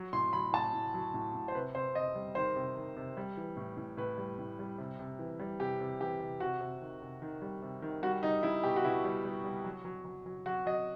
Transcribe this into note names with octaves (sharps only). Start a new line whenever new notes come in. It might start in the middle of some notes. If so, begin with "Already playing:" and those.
Already playing: F#3
A2 C6
F#3 B5
A2 A5
A2
F#3
A2
A2
C5
C3 B4
C3 C5
C3 D#5
G3
D#3 C5
C3
D#3
C3
G3
E3
A2
A2
A2 B4
G3
A2
G3
C3
C3
E3
G3
C3 G4
C3
E3 G4
C3
C3 F#4
C3
D#3
C3
D#3
G3
C3
D#3
G3 F#4
G3 D#4
G3 E4
B2 G4
F#4
B2 E4
G3
G3
G3
F#3
F#3
F#3
F#3
F#3 F#4
F#3 D#5